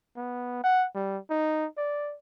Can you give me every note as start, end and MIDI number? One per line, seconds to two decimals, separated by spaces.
0.16 0.62 59
0.63 0.87 78
0.95 1.18 55
1.30 1.66 63
1.78 2.15 74